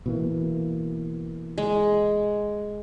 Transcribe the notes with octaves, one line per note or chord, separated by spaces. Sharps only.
B2 E3 A#3
G#3